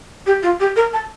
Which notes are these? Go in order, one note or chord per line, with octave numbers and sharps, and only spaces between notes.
G4
F4
G4
A#4
A5